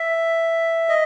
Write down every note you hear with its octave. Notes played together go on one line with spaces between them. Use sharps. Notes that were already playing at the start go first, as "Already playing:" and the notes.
Already playing: E5
D#5